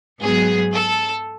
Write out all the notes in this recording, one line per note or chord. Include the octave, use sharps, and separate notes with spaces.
G#2 F#3 B3 G#4
A4